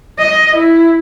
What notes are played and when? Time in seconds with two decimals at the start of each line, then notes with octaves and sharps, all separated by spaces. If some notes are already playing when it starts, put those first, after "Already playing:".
0.19 D#5
0.56 E4